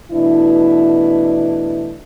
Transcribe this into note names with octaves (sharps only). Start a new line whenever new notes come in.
B2 E3 A3 D4 E4